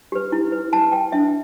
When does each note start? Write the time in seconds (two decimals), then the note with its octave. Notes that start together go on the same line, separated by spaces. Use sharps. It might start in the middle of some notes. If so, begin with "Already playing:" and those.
0.12 G4 B4
0.32 E4
0.52 B4
0.72 E4 A5
0.92 B4 G5
1.12 D4 E5